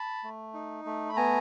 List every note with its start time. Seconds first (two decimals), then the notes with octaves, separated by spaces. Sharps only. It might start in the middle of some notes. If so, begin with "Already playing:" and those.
Already playing: A5 B5
0.24 A3
0.54 D#4
0.86 A3
1.09 B5
1.16 B3 G#5 A#5